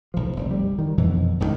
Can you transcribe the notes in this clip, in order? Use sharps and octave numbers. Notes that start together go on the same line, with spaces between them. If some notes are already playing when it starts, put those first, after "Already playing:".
B1 F3
F1
G3
D#3
F2 B2 D3 E3
G#1 C#2 C3 D#3